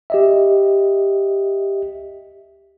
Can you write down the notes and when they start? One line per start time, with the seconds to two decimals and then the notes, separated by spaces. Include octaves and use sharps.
0.10 G4 D#5 E5